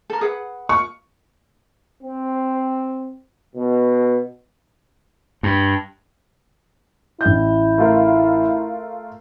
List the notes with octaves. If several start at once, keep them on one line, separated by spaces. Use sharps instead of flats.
A4 A#4
G#4 B4 F#5
F4 C#6
C4
B2
G2
A1 E4 G6
A3 F4 A#4